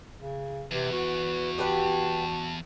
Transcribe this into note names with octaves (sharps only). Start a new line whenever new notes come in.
C#3
E2 C3 B4
F#4
G4 B4 F#5 A5